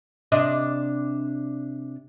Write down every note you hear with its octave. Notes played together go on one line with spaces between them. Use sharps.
C3 D4 D#5